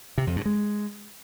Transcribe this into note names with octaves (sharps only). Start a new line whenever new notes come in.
C3
F2
G2
G#3